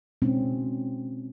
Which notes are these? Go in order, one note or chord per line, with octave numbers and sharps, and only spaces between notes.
B2 G#3 C4 C#4 D#4